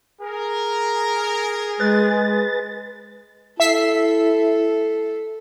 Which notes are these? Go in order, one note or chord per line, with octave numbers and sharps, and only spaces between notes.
G#4 A#4
G#3 B4 A6
E4 A4 E5 B6 C7